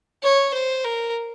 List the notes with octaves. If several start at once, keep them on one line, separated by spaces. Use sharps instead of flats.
C#5
C5
A#4